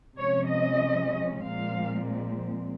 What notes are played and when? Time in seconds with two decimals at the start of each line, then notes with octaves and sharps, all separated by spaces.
0.16 C3 F3 G#3 C#4 C#5
0.48 D#5
1.43 A#2 F3 G#3 C4 F5